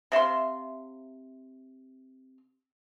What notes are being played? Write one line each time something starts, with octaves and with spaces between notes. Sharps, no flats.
C3 E5 F5 C6